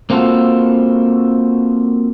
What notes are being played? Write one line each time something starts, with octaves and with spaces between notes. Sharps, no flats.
A#3 C4 F4 F#4 A4